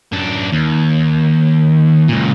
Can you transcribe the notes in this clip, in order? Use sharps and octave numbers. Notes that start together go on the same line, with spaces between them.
F#2 D4
D#2
C#2 A#2